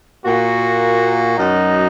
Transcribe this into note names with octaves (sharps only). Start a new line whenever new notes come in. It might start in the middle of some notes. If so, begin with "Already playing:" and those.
A#2 A#3 F#4
F#2 F#3 D#4